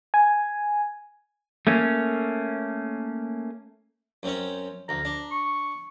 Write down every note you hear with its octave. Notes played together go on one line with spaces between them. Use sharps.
G#5
A3 A#3 C#4
F#2 C4 C#4
D2 A#5
D4
C#6